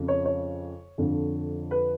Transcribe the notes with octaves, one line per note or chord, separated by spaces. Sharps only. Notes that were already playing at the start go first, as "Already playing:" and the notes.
Already playing: F2 C#3
C#5
C#5
F2 D3
B4